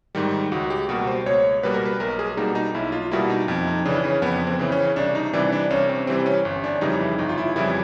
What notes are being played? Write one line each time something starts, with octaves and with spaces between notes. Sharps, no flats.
G#2 D#3 G3
C#2 F#4
G4
B2 G3 A#3 F#4
C5
C#2 C#5
B2 G3 A#3 B4
A#4
B4
B1 A#4
G#4
B2 G3 A#3 D#4
D#4
B1 E4
F4
B2 G3 A#3 E4
D#4
F2
D#4
C#3 E3 D4
C#4
F2 B3
C4
C#3 E3
C#4
C2 D4
D#4
C3 E3 G3 D4
D4
C2 C#4
C4
C3 E3 G3 C4
C#4
G1
D4
F2 C#3 E3 G3 D#4
E4
G1 D#4
F4
E4
F2 C#3 E3 G3 E4